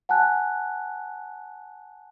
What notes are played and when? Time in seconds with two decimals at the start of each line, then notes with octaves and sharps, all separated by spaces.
0.09 F#5 G#5 A5 F#6